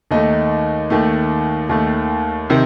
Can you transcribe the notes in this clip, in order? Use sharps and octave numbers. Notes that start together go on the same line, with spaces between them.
D#2 D#3 A3 D#4
D#2 D#3 A3
D#2 D#3 A3
C3 D#3